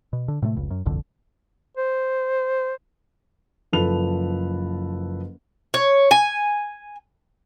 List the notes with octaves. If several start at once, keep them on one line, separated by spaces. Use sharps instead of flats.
B2
D3
A2 C3 G#3 A3
F1 C#2
F#2
G1 C2 F2 D3
C5
F#1 F3 A4 B4 F7
C#5
G#5